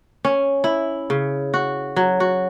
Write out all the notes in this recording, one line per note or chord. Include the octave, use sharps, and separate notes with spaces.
C#4
E4
C#3
F#4
F#3
F#4